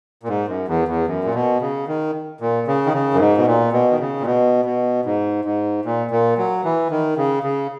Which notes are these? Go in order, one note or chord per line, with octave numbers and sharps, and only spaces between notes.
A#2
G#2
F#2
E2
E2
F#2
A#2
B2
C#3
D#3
A#2
C#3
D#3
C#3
F#2
G#2
B2
A#2
B2
D#3
C#3
A#2
B2
B2
G#2
G#2
A#2
A#2
F#3
E3
D#3
C#3
C#3